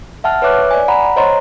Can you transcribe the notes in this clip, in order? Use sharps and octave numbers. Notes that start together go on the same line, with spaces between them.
E5 F#5 A5 F6
B4 C#5 E5 D6 F#6
D5 G#5
F#5 A#5 B5
C5 C#5 D#5 A#5 C6